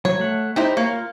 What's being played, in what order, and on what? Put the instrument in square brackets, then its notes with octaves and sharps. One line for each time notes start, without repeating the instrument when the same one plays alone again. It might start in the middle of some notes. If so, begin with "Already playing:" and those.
[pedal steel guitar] F#3 [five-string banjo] C#5
[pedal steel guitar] A3 F#5
[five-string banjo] D#4 E4 C5 [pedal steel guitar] G4
[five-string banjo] A#3 [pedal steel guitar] C#5
[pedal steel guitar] F4